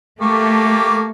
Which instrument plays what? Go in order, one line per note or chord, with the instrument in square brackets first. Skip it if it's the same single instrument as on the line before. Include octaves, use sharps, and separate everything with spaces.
[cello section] A3 [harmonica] A#3 G4 C#6